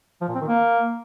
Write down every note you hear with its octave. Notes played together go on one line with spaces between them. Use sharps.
F3
A#2
C4
D#3
A#3